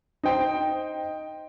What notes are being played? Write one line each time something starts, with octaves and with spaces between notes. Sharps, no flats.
D#4 C5 G5